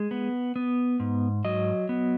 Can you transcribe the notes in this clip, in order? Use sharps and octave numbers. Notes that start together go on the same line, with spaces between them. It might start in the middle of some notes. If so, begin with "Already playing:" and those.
Already playing: G#3
B3
B3
G#2
F#3 D#5
B3